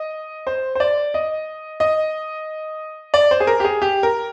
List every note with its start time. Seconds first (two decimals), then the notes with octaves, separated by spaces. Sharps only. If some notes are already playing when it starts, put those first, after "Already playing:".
Already playing: D#5
0.47 C5
0.75 C5
0.80 D5
1.14 D#5
1.80 D#5
3.14 D5
3.31 C5
3.40 G#4
3.47 A#4
3.60 G4
3.65 G#4
3.82 G4
4.03 A#4